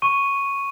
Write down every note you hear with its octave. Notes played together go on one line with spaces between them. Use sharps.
C#6 D#7